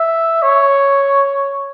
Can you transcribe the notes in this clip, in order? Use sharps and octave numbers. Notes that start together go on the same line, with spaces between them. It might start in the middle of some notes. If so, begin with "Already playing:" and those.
Already playing: E5
C#5